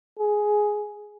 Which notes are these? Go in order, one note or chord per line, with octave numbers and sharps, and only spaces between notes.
G#4